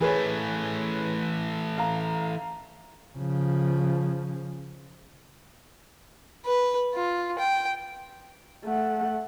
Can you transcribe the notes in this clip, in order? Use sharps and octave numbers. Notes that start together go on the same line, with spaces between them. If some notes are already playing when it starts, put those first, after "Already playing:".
E3 A3 G#4 B4 C#5
F5 A#5
C#3 F3
B4
F4
G5
A3 F#5